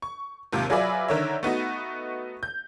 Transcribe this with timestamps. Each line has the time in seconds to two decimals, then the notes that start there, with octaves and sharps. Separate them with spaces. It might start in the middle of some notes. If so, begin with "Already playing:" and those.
0.02 C#6
0.53 D#2 G#2 C3 F4
0.70 F#3 F4 G#4 B4 D5 E5
1.08 D3 D#3 A#4 C#5 E5
1.43 A3 B3 D#4 F#4
2.43 G6